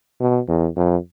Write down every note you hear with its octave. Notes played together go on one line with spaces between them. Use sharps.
B2
E2
F2